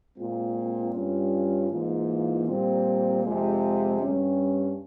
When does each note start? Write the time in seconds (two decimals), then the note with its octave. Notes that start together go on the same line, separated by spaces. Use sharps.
0.17 A#2 G#3 C4 F4
0.94 G2 G3 C#4 F4
1.71 G#2 E3 A#3 F4
2.47 A#2 G3 C4
3.24 F2 C3 F3 G#3
4.01 G2 G3 C#4